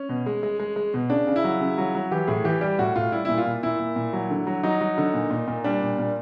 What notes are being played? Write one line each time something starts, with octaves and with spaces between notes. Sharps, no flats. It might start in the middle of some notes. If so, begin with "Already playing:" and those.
Already playing: C#4
B2
G#3
G#3
G#3
G#3
B2
C#3 D4
C#3
E4
F#3
C#3
F#3
F#3
E3 G4
A2 G#4
E3 G4
G3 G4
A2 F#4
A2 F4
G3 E4
A#2 E4
F4
A#2
A#2 E4
A#2
A#2
F#3
D3
F#3
F#3 D#4
F#3
D3
A#2
A#2
A#2
G3 D4
A#2
A#2